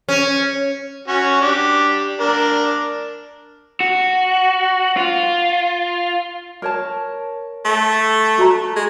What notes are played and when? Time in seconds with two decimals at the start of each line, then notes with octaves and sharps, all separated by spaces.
0.09 C#4
1.08 C#4 F#4
1.41 D4 G4
2.20 D4 A#4
3.80 F#4
4.97 F4
6.62 A#4 C#5 A5
7.65 A3
8.38 F#4 A4 A#5
8.76 G#3